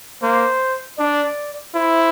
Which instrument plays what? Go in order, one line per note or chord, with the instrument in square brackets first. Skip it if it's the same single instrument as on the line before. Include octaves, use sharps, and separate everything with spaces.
[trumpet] A#3 [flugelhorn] C5
[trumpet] D4 [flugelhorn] D5
[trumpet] E4 [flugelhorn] C5